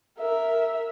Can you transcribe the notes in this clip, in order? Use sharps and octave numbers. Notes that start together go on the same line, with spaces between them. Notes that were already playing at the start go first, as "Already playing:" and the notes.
A#4 E5